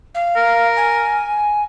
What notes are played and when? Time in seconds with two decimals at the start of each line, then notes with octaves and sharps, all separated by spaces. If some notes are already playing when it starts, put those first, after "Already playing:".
0.14 F5
0.36 A#4
0.76 G#5